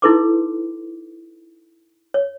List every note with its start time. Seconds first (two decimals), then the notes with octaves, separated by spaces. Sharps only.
0.02 D#4 E4 A4 B4 C6 D6
2.14 C#5